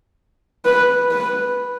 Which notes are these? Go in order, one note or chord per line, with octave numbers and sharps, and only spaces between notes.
B4
B4